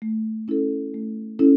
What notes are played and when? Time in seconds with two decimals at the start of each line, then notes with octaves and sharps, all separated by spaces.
0.02 A3
0.48 C#4 E4 A4
0.94 A3
1.39 C#4 E4 A4